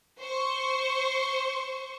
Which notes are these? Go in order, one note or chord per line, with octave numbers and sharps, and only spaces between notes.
C5 C#6